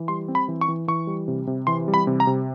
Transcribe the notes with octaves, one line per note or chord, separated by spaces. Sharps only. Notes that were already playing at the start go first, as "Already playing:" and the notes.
Already playing: E3
G3 C6
C4
B5
E3
C#6
E3
E3 C#6
G3
C3
C3
E3 C6
G3
B5
C3
A#5
C3